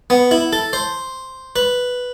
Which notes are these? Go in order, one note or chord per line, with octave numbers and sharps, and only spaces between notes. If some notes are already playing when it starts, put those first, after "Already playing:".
B3
E4
A4
C5
B4